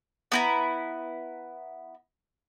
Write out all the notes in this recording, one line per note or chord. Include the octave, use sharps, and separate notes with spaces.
B3 E4 A#5